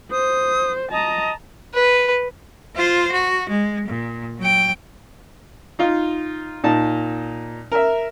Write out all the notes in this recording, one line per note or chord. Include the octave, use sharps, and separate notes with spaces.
C5 D#6
D#5 A5 A#5
B4
F4 C5
F#4
G#3
A#2
F#3 G5
D#4 F4
A#2 D#4 A5
A#4 E5